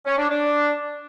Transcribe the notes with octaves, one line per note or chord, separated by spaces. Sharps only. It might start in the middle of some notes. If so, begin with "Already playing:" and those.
C#4
D4
D4